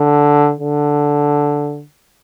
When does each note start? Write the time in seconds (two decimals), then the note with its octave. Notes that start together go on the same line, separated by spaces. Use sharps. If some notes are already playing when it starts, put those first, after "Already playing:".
Already playing: D3
0.60 D3